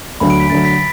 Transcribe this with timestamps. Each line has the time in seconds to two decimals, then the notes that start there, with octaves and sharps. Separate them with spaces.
0.20 D2 D3 F#3 B5
0.30 D7
0.40 B6
0.50 D2 D3 F#3 A6
0.65 B6